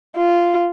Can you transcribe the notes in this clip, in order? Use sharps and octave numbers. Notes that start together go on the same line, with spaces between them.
F4